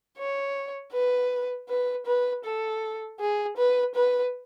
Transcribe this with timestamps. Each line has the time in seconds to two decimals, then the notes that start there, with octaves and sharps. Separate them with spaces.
0.18 C#5
0.93 B4
1.69 B4
2.06 B4
2.45 A4
3.20 G#4
3.57 B4
3.95 B4